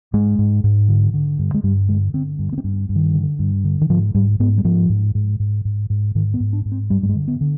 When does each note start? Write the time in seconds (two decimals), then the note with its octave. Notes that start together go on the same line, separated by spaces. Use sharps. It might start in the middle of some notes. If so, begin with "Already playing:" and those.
0.13 G#2 G#3
0.39 G#2
0.64 G#2
0.89 D3
1.14 D3
1.39 G2
1.54 G#3
1.63 G2 G3
1.89 D3 G#3
2.14 D3 C4
2.39 G2
2.53 B3
2.58 C4
2.64 G2
2.89 G2
2.96 D#3
3.14 D3
3.39 G2
3.64 D3
3.81 D#3
3.89 G#2 F3
4.15 G#2 G3
4.40 G#2 B3
4.58 G3
4.64 G#2 F3
4.90 G#2
5.15 G#2
5.40 G#2
5.65 G#2
5.90 G#2
6.15 G#2 D#3
6.34 B3
6.40 G#2
6.53 D4
6.65 G#2
6.72 C4
6.90 G2 G3
7.03 G3
7.09 G#3
7.16 D3
7.28 B3
7.41 D3